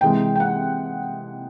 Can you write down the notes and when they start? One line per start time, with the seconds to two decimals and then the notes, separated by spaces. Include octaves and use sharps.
0.01 C3 E3 G#3 G5
0.35 G5
0.40 F#5